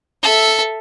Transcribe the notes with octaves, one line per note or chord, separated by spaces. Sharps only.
A4 E5